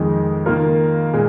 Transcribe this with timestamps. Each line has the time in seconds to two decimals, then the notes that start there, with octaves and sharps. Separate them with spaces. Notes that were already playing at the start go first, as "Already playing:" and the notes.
Already playing: F2 D#3 G#3 D#4
0.46 D#3 A#3 F4 A#4
1.13 A#2 G#3